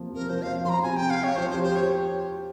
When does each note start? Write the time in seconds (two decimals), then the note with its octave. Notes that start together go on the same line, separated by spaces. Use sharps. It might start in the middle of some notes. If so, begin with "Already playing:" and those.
Already playing: C3 F3 A#3
0.11 C3 A#4
0.29 F3 C5
0.42 F3 F5
0.65 F3 A#5 C6
0.83 C3 G#5
0.96 C3 G5
1.10 F5
1.19 C3 C#5
1.36 F3 C5
1.50 G4 C5
1.64 C5
1.72 G4 C#5